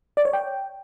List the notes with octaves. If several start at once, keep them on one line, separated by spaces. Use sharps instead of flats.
D5
C#5
G5